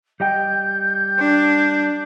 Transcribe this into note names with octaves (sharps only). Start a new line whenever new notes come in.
G3 D#5 G5 G6
D4